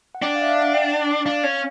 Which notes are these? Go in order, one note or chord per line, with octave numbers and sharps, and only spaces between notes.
F#5
D4 G5
F5
E5
F5
F#5
G5
D4 F5
C#4